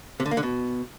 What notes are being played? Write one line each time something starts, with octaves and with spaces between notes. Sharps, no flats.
C3
D3
A#3
D3
B2